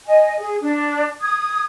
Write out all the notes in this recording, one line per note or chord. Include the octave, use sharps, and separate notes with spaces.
D#5 G#5
G#4
D4
D#6 G#6